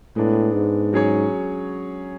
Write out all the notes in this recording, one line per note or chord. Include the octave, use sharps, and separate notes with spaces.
A2 G#3 B3 D4
G#2
F#3 C#4 G#4 C#5